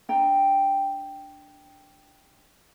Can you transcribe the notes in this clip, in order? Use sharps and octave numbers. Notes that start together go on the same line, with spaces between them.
D4 G5 A#5